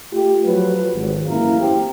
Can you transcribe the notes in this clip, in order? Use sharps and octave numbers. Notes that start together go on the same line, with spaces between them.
A3 F4 G4
F3 F#3 B4
G#1
A1 F#2 A#3 E4 F5 A#5
C4 G4